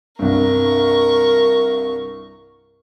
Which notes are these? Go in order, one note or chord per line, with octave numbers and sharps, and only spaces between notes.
C2 G2 A#4 C#6